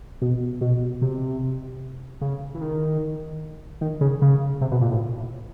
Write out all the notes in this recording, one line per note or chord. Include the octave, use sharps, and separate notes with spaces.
B2
B2
C3
C#3
E3
D#3
D#3
C#3
C#3
C3
B2
A#2
A2